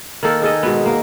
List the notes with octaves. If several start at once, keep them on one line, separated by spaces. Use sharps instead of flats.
D#3 A#3 A4
D#4 G#4 A4 D#5
G#2 B2 B3
A#3